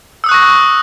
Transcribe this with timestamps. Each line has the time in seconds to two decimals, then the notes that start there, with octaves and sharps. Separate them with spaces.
0.24 E6
0.26 D#6
0.29 F#6
0.31 C#6
0.34 A#6